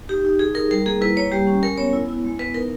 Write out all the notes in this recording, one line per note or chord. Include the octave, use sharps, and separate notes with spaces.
D#4 G4
D#4
D#4 G#4
D#4 A#4
G3 A#4
A#3 G#4
E4 B4
A#3 C#5
G3 G4
C#4
G#3 A#4
B3 C#5
E4
E4
G#3
B3 B4
D#4 A#4